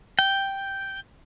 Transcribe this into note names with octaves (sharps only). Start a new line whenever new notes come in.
G5